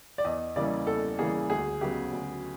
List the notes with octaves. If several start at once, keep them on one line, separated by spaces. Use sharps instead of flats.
D5
E2 D#5
C#3 E3 G3 A#3 D5
E2 A4
C#3 E3 G3 A#3 G#4
D2 G#4
C#3 F#3 B3 G4
D2